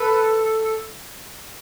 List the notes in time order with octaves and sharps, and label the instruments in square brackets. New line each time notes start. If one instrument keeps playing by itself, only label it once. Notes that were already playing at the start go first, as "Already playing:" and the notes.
Already playing: [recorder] A4 [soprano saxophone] B4